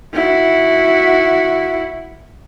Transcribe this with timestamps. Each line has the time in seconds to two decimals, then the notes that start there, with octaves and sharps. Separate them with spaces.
0.13 E4 F#4